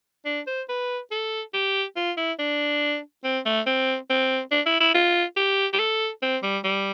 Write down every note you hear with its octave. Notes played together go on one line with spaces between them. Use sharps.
D4
C5
B4
A4
G4
F4
E4
D4
C4
A3
C4
C4
D4
E4
E4
F4
G4
G4
A4
C4
G3
G3